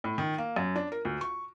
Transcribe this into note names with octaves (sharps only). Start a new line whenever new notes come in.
A2
D#3
A#3
F#2
D4
A#4
D2
C#6